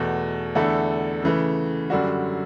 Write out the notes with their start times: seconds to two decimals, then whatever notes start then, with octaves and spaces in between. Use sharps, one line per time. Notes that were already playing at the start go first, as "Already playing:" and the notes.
Already playing: E2 B2 A3
0.55 E2 D3 A3 E4 A4
1.23 C#3 E3 A3
1.90 F#2 D3 G3 D4 F#4